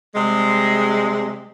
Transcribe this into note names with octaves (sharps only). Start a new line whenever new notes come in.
C3 G3 G#3